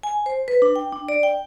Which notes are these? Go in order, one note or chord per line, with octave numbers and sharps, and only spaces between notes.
G#5
C5
B4
D4
G5
D4
D5
G5